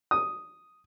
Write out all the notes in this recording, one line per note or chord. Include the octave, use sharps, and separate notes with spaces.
D#6